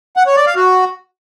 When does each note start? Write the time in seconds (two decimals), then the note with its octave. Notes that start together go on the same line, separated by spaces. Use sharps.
0.17 F#5
0.26 C#5
0.36 D5
0.46 F5
0.56 F#4